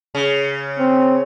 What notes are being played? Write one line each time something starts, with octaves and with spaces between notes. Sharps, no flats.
C#3
C4